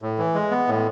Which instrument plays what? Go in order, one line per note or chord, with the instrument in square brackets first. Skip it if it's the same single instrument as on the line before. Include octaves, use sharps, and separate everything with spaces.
[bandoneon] A2
E3
G#3
B3
A2